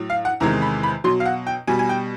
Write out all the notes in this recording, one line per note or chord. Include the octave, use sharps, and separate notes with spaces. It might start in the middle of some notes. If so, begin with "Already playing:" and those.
Already playing: A2 F#3
F5
F#5
E2 C3 D#3 G#3 A#5
B5
B5
B2 F#3 C6
F5
F#5
G5
B2 G3 G#5
G#5
G5